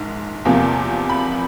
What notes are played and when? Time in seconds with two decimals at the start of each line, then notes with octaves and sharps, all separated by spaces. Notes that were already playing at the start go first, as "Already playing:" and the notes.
Already playing: A#1 G#2 D#3
0.45 E2 C3 F3 A#3
1.10 B5